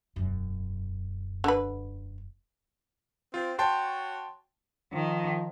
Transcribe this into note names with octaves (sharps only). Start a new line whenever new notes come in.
E1 F#2
D3 B4
C4 F4
F#4 C#5 G5 A5 C6
D#3 F3